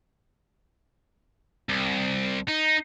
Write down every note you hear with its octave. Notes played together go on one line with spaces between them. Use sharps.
C2
D#4